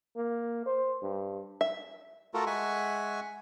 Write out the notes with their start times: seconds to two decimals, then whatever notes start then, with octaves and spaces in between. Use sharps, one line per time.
0.16 A#3
0.66 C5
1.02 G2
1.61 E5
2.34 A3 F4 F#4 A4 A#4
2.46 G#3 E5 F#5 G#5 C#6